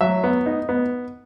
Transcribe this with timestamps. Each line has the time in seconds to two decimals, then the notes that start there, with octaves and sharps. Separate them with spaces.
0.01 F#3 E5
0.24 B3
0.46 D#4
0.69 B3